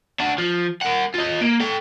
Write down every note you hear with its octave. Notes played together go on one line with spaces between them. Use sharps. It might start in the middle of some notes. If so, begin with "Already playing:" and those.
D4 F#4
F3
A#4 F#5
F4 D#5
A#3
A4 G5